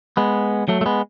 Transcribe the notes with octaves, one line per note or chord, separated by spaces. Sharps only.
G#3 B3
F#3 A3
A3
G#3 B3